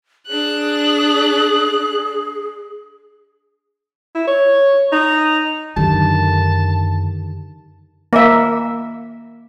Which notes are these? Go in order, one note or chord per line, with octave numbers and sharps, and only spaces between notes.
D4 G#4 F#6
E4
C#5
D#4
F#2 D3 D#3 G4 A5
A#3 E5